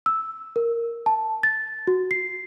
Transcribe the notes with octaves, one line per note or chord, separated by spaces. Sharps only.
E6
A#4
A5
A6
F#4
C7